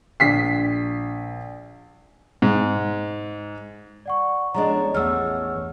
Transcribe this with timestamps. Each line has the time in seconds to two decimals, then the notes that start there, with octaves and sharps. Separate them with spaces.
0.20 A#1 B6 C7
2.42 G#2
4.06 D5 F#5 C#6
4.54 A1 F3 G#3 B3 D4 C#5 D#5 A#5
4.94 E2 A3 F#5 E6 F6